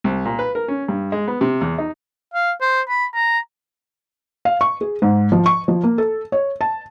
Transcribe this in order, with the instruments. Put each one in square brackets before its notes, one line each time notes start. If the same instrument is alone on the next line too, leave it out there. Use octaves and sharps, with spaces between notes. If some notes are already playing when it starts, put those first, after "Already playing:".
[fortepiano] C2
A#2
B4
A#4
C#4
G2
G#3
B3
C3
E2
D#4
[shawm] F5
C5
B5
A#5
[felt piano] F5
C#6
G#4
G#2
F3
C#6
F3
A#3
A4
C#5
A5